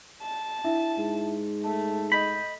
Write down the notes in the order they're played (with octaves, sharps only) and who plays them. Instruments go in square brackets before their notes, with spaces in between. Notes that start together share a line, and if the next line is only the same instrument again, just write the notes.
[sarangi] A5
[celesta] D4 E4 E5
[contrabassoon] G#2
[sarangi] A3 [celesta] A5
[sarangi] D#5 [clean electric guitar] B5 [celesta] G6